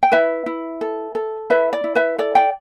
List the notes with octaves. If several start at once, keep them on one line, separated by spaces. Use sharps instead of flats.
G5
E4 B4 E5
E4
A4
A4
E4 B4 E5
D5
E4
B4 E5
A4 D5
D5 G5